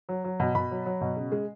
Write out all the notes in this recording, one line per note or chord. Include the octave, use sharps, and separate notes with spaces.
F#3
F#3
B2
B2 B5
F#3
F#3
B2
C#3
G#3